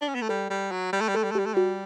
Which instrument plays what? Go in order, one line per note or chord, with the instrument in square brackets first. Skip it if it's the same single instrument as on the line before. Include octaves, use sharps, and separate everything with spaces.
[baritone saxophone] D4
C#4
B3
A3
[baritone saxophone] G3 [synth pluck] A4
[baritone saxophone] G3
F#3
G3
A3
G3
[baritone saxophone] A3 [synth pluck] A4
[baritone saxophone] G3
A3
[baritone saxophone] G3 [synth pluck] G4
[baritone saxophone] A3
[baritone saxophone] G3 [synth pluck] F#4